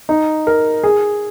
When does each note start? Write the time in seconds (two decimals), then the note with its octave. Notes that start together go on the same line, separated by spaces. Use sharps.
0.09 D#4
0.47 A#4
0.84 G#4